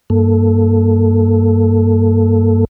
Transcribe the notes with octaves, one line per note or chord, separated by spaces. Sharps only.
G2 A#3 A4